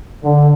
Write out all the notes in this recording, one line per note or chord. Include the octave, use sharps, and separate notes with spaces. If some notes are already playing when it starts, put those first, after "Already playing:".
D3